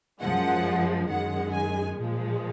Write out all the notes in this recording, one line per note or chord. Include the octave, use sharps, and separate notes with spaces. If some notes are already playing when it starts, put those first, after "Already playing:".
F#2 F3 G#3 F#5
F#2 D#3 G#3 F#5
G#5
A#2 F3 G#3